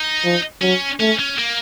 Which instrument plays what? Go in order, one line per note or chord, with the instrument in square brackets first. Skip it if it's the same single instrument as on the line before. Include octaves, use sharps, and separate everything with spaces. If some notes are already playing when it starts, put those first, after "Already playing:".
Already playing: [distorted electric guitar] D#4
[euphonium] F3
[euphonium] F#3 [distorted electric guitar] C#4
[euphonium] A3 [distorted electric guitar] C#4
[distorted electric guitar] C#4
A#3